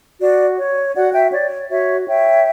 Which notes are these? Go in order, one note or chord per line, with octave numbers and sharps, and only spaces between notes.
F#4 D5
C#5
F#4 D5 F#5
E5 G5
C#5 D5
F#4 C#5 E5
C#5 E5 G5